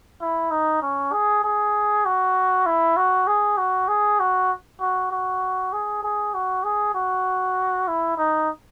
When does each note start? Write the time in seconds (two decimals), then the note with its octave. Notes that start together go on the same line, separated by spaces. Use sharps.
0.21 E4
0.51 D#4
0.82 C#4
1.12 G#4
1.44 G#4
2.05 F#4
2.66 E4
2.97 F#4
3.27 G#4
3.57 F#4
3.88 G#4
4.20 F#4
4.80 F#4
5.11 F#4
5.73 G#4
6.03 G#4
6.34 F#4
6.64 G#4
6.95 F#4
7.88 E4
8.17 D#4